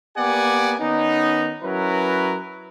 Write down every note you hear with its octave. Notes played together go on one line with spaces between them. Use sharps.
A#3 B3 G4 D5 F#5 G#5
D#3 B3 C#4 D#4
F#3 C#4 E4 A#4 B4